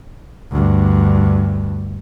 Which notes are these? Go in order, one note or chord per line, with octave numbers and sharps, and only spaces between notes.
D2 G2